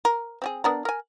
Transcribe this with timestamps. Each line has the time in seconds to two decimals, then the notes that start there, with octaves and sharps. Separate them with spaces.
0.05 A#4
0.42 C4 G4 G#4
0.64 B3 D4 A#4
0.85 A#4 G#5